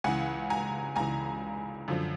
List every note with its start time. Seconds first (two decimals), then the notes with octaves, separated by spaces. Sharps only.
0.04 C#2 C#3 E3 F#5 G#5
0.50 G#5 A#5
0.96 C#2 C#3 E3 G#5 A#5
1.88 F#2 D3 F3